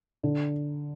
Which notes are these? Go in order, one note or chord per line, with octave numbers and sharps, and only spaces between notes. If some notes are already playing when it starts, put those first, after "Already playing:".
D3